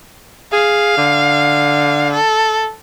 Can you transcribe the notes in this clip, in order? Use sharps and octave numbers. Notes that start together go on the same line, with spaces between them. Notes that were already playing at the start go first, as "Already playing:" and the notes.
G#4 F5
D3
A4